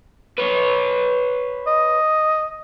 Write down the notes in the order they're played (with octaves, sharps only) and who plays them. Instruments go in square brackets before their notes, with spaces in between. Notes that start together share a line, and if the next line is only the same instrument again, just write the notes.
[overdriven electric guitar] B4 C#5
[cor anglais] D#5